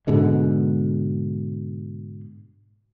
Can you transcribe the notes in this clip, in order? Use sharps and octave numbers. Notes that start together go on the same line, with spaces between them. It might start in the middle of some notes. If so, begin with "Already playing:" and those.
G#2 B2 D3 G#3